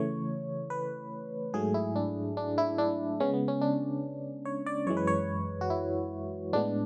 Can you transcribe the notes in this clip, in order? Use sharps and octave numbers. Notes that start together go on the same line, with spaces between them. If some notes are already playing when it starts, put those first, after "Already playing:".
Already playing: C#3 E3 A3 C#5
B4
G#2 F#3 A3 G#4
E4
D4
D4
E4
D4
C#3 G#3 B3 C#4
B3
C#4
D4
C#5
D5
F#2 E3 G#3 C#5
B4
C#5
F#4
E4
A2 G#3 B3 D4